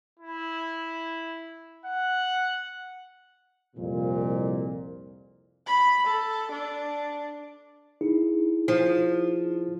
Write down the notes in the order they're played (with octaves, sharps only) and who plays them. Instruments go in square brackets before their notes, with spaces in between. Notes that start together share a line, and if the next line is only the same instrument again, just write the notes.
[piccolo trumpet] E4
F#5
[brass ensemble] C2 F2 A#2
[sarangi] B5
A4
D4
[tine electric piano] D#4 E4 G#4
[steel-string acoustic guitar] F3